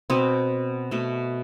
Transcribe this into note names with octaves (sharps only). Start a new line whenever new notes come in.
B2 B3 C4
B2 A3